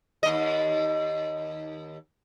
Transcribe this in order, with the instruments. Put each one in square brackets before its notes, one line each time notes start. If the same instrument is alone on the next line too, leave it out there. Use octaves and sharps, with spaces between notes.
[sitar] D#2 D#5